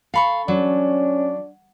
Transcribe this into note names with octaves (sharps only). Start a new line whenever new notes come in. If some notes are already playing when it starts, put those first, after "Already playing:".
A4 F5 B5 C#6
F#3 C#4 D4